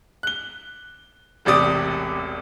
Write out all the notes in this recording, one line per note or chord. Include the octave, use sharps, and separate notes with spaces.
F#6 G7
E1 A1 C3 D5 D#6